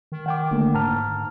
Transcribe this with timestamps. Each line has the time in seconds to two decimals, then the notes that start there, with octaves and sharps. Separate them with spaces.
0.12 D#3
0.26 D#3 F#5 G5 D6
0.51 F1 D3 A3 A#3
0.74 G#2 A5 A#5 F6